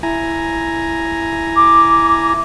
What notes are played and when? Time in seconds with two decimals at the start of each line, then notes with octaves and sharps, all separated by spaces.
0.03 E4 G#5 A#5
1.56 D6